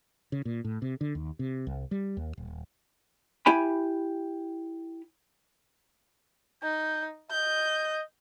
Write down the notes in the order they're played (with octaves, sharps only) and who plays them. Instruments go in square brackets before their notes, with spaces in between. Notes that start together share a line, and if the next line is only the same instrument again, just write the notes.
[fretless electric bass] C#3
A#2
A2
C3
D3
D#2
C3
C2
G3
D#2
D#1
[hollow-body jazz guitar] E4 G4 G#5 B5
[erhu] D#4 [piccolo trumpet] G6
[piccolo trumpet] D#5 [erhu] G6